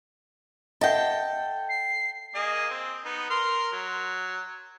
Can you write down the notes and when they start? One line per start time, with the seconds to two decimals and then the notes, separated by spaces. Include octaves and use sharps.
0.81 A4 D#5 E5 F#5 G5
1.69 C7
2.35 A#3 G#4 D#5
2.70 C4
3.05 B3 D#4
3.30 A#4 C6 F6
3.72 F#3